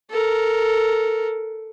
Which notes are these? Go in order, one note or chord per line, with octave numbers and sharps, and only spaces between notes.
A4 A#4